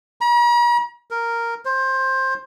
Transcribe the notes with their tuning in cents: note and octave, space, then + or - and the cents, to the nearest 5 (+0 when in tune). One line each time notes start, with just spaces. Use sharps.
A#5 +45
A#4 -5
C5 +15